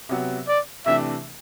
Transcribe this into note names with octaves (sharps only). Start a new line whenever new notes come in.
C3 F#3 B3 F#4
D5
C3 E3 A3 D4 E5